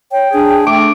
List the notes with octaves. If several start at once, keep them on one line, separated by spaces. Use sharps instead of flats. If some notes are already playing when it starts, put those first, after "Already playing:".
C#5 G5
D4 G#4
A3 D6